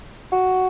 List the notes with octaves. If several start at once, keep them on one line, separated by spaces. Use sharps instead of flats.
F#4